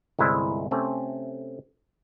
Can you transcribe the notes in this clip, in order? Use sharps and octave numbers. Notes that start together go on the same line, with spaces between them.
G1 C2 G#3 E4 C5 E5
C3 A3 C4 C#4